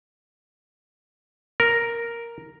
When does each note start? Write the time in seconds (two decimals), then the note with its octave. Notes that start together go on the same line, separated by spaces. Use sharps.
1.60 A#4